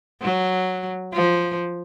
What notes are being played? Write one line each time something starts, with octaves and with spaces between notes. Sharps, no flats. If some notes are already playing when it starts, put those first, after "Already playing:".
F#3
F3